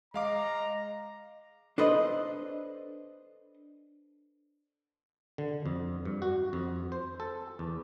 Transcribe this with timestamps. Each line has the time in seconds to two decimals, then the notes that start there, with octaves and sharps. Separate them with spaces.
0.14 G#3 D#5 F5 A#5 D6
1.78 D4 A4 B4 C5 D#5
5.38 D3
5.66 F2
6.05 G2
6.22 F#4
6.53 F2
6.92 C5
7.20 A4
7.59 E2